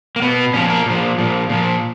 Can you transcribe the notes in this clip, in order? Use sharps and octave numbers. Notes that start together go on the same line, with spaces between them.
A#3
B2 B3
A#2 F3 C#4
A#4
A#2 F3
A#2 F3
A#2 F3